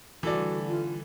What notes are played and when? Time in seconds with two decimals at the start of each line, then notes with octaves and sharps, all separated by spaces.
0.23 D3 E3 G3 A3 F#4 A4 D5
0.68 F4